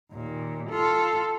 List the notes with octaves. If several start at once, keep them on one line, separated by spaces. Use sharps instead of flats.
D#2 A#2
F4 A4